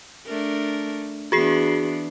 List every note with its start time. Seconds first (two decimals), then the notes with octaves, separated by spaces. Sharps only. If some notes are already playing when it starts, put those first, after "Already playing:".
0.26 A3 D4 A#4
1.32 E3 B3 D4 F#4 G#4 C7